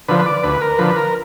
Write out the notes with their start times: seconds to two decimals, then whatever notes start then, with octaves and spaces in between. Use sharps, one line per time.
0.08 D3 F3 B4
0.19 B4
0.26 D5
0.43 D2 B4
0.61 A#4
0.78 D3 F3 B4
0.96 A#4